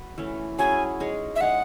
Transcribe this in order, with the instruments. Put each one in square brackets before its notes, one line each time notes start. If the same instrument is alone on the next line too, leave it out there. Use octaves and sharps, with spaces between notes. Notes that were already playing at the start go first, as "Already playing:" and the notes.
Already playing: [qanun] F#4 B4
E3 A3 C#4
[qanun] F#3 C#4 E4 G#4 [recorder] G#5
[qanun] G#3 D#4 G#4 C#5
[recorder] E5
[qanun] G#3 D#4 G#4 C#5 [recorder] F#5